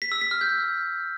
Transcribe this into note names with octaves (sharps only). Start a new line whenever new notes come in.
B6
E6
B6
F6
G6